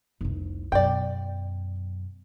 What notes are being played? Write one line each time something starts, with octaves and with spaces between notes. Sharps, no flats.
F1 C2
F#2 B2 D5 G5